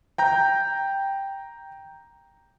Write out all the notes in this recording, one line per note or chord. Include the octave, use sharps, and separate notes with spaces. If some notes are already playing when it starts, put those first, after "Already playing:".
G5 A#5 G6